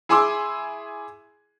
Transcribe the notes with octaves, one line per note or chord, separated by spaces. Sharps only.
E4 G#4 G#5 C6 D6 E6